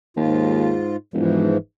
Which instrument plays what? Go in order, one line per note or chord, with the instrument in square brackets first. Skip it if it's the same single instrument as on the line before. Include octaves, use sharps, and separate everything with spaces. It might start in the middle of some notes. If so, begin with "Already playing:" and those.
[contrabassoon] D#2 [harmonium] G#2 F4
[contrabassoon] E1 [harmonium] G#2 E3 F3